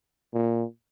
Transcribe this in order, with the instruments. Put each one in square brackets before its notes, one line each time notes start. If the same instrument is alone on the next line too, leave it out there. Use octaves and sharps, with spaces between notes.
[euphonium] A#2